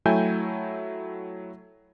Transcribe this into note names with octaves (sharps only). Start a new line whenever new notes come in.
F#3 A3 E4 G5 G#5 G6